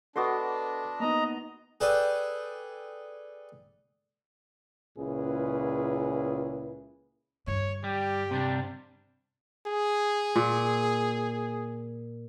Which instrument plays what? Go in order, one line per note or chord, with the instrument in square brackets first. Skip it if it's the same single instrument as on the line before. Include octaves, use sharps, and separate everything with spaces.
[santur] B3 F#4 C6 [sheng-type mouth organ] D4 [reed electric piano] A4 D#5 D6
[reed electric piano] A#3 B3 D#4 [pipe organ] D#5 A#5
[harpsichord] G#4 A4 B4 D5 G5
[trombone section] C#2 A#2 C#4 E4 G#4 B4
[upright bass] G2 D3 [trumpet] C#5
[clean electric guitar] G3 [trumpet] G4
[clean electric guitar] C3 G3 D4
[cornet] G#4
[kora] A#2